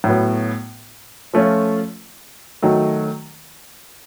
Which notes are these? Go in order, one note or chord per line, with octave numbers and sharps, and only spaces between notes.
A2 F#3 B3
F3 A3 C#4 F4
D#3 F#3 A3